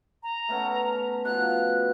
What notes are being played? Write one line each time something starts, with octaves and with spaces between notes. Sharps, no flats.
A#5
A3 B3 C#4
B2 F3 F#6